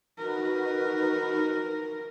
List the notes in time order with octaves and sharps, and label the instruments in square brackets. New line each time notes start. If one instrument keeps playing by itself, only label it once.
[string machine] D#4 F#4 B4 [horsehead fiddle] A#4